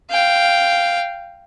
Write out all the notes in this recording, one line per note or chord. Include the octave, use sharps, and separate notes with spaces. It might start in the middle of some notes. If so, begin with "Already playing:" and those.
F5 G5